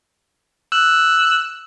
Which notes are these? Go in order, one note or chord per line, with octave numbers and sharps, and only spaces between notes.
E6 F#6